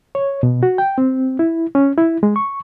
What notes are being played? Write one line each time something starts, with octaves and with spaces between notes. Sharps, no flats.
C#5
B2
F#4
G5
C4
E4
C#4
E4
G#3
C#6